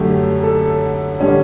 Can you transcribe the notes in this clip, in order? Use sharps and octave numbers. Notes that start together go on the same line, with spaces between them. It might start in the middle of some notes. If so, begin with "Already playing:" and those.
Already playing: F#2 D3 F#3 A3 G4
A4
D3 G3 C#4